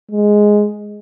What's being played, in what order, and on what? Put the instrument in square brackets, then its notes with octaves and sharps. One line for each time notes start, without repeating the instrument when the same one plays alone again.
[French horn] G#3